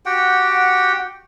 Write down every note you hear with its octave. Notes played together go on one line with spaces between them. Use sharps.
F#4 G4 F#5 G5